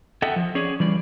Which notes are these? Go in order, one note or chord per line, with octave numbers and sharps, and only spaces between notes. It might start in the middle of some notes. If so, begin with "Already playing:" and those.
A4 D#5 E5 F#5 G5
F3
C#4 G#4 C#5 D5
E3 G3 D5